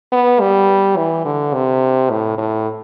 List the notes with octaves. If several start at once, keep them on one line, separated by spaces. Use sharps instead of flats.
B3
G3
E3
D3
C3
A2
A2